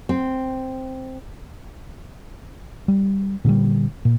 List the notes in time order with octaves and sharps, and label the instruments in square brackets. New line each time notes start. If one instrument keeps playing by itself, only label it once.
[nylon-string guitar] C4
[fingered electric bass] G3
A#2 D3 D#3 G3
A#2